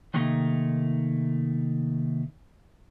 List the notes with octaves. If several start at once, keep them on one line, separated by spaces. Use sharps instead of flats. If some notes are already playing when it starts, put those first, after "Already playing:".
C3 D#3 A3 A#3 D#4